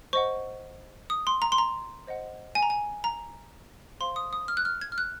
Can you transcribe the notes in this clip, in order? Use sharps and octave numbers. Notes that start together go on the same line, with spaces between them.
C5 D#5 F#5 C#6
D#6
C6
A#5
C6
A#5
C5 D#5 F#5
G#5
A#5
G#5
A#5
C5 F5 C6
D#6
D#6
F6
F#6
F6
G#6
F6
F#6